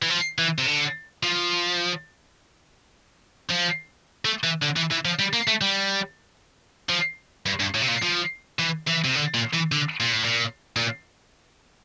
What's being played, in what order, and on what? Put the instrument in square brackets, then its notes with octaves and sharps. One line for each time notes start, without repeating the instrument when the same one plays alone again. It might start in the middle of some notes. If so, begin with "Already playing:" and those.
[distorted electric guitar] E3
F3
E3
C3
D3
F3
F3
A3
E3
D3
E3
E3
F3
G3
A#3
A3
G3
F3
G2
G2
A2
C3
A#2
F3
E3
E3
C3
D3
A#2
E3
D3
A#2
A2
A#2
A#2